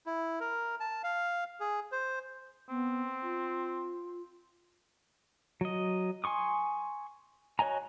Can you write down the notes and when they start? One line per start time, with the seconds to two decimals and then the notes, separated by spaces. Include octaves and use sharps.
0.06 E4
0.40 A#4
0.80 A5
1.03 F5
1.60 G#4
1.92 C5
2.69 B3 C4
3.23 F4
5.61 F#3 D#5
6.24 G#5 C6 C#6 D#6
7.59 F#4 C#5 D#5 G#5 A#5